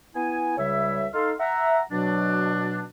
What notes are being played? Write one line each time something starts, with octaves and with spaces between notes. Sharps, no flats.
B3 E4 G#5
C#2 C#3 G3 C#5 E5
D#4 A4 F5 C6
E5 F#5 A#5
B2 F#3 D4